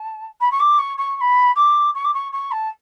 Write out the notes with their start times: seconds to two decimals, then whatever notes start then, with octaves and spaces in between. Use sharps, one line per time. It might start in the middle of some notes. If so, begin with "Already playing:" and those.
Already playing: A5
0.40 B5
0.51 C#6
0.59 D6
0.78 C#6
0.97 C#6
1.16 C#6
1.20 B5
1.55 D6
1.94 C#6
2.04 D6
2.14 C#6
2.32 C#6
2.51 A5